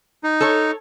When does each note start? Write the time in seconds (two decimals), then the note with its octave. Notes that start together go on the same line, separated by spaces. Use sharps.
0.24 D#4
0.41 A4 C#5